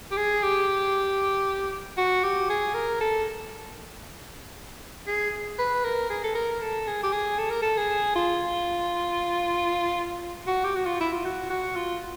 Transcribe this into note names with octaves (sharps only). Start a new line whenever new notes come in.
G4
G#4
G4
F#4
G4
G#4
A#4
A4
G#4
B4
A#4
G#4
A4
A#4
A4
G#4
G4
G#4
A4
A#4
A4
G#4
F4
F#4
G4
F#4
F4
E4
F4
F#4
F#4
F4